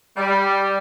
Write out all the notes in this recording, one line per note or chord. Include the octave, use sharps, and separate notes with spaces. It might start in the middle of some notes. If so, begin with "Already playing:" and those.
G3